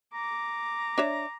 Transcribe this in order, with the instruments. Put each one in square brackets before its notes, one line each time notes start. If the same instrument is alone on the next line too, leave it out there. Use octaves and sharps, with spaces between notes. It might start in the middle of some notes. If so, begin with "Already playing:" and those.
[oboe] A#5 [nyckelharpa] D6
[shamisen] D4 C#5 E5